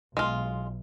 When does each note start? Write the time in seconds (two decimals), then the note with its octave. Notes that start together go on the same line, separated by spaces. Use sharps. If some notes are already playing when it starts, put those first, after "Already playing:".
0.17 B1 G#3 F4